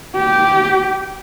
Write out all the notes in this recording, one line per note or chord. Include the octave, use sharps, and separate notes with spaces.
G4